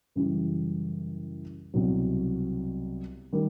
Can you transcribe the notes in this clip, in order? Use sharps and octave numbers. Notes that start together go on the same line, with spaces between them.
F#2 C#3 E3 G3
C2 B2 F#3
D#3 G3